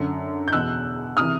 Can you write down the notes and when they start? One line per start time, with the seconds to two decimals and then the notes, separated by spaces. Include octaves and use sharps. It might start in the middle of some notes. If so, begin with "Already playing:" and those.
Already playing: F#2 D3
0.48 G6
0.52 E2 B2 E6 F#6
1.17 C3 E3 D#6 F6